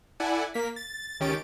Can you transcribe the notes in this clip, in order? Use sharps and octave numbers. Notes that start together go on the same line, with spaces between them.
E4 A4 D5 F#5 G#5
A#3 B6
A6
C#2 D#3 C#4 G4 A6 D7